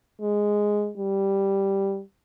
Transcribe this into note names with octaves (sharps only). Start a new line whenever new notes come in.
G#3
G3